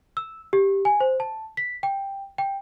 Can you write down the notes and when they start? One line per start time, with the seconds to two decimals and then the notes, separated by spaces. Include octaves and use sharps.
0.17 E6
0.53 G4
0.85 G#5
1.00 C5
1.20 A5
1.57 B6
1.83 G5
2.38 G5